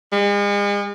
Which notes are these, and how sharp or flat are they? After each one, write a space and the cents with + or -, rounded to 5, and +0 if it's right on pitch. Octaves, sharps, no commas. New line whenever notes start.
G#3 -40